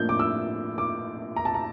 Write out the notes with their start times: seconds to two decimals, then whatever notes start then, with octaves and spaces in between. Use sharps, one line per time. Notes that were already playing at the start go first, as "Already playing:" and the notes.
Already playing: A2 F3 A#3 D4 G6
0.09 D6
0.19 E6
0.78 D6
1.36 A#5
1.45 A5
1.54 A#5